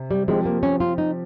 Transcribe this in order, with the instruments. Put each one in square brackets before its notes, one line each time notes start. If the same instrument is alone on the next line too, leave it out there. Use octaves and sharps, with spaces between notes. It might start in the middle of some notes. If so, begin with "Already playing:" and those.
Already playing: [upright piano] C3
[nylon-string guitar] G3
[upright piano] F3 C4 G4 [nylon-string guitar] G#3
[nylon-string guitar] A#3
C#4
F4
D#4